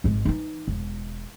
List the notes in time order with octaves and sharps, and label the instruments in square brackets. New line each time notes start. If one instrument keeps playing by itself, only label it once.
[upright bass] G#1 G#3
E3 D#4
E1